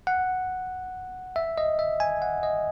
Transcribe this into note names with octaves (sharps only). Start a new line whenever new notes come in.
F#5
E5
D#5
E5
G#5
F#5
D#5